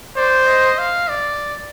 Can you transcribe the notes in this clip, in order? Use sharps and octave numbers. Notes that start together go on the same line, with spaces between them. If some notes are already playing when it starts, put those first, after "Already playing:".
C5 D5
D#5
F5
D5